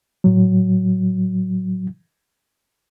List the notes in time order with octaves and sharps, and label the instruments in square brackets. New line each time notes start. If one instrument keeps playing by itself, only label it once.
[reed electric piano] A2 F#3